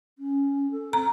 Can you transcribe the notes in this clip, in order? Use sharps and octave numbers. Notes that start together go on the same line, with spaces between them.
C#4
A4
C4 A#5